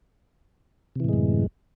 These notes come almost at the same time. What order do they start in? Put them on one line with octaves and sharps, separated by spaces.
C3 E3 A2 G#3 F#2